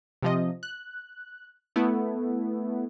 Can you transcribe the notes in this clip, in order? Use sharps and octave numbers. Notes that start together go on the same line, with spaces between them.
C3 F3 D#5
F#6
A3 B3 E4